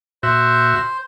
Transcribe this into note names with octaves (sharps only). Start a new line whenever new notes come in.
A#2 F#4 C5 E5